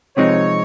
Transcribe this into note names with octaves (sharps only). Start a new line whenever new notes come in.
C3 F3 G#3 C4 D#4 C#5